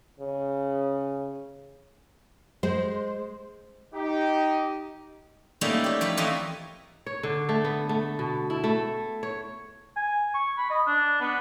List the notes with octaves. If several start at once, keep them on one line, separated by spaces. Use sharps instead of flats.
C#3
G#3 C5
D#4 G4
G3 A3 A#3 C#4 D#4 E4
G4 C#5
F3 C#5 B5
E3 A3 C4 F4 D#5
C#5
D3
A3
B3
A3
B2
E4
A3
C#5
G#5
C#6
B5
D#5
D4
B3